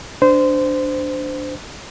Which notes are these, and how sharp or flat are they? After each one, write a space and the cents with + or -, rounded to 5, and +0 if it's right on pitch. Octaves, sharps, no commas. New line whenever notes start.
D4 +0 C5 -20